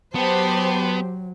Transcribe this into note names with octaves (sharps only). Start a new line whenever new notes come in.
F#3 B3 G4 C5 A5